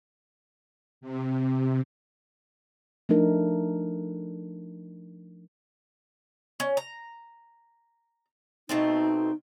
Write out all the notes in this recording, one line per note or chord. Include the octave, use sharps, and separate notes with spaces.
C3
F3 A3 D4 D#4 A#4
C#4
A#5
B2 A3 C4 D#4